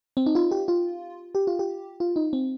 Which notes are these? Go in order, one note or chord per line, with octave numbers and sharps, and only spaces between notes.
C4
D#4
F4
G4
F4
G4
F4
G4
F4
D#4
C4